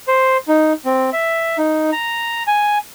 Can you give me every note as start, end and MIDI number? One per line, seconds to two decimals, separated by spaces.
0.08 0.37 72
0.48 0.73 63
0.85 1.10 60
1.13 1.57 76
1.58 1.90 63
1.92 2.43 82
2.47 2.78 80